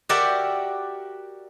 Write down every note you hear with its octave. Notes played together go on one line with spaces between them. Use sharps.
F#4 G4 A#4 D5 E5 F#5